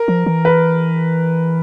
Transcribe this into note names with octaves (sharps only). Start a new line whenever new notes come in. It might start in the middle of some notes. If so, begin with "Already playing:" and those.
Already playing: A#4
F3
E3
B4